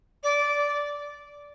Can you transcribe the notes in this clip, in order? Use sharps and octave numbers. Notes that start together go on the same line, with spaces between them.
D5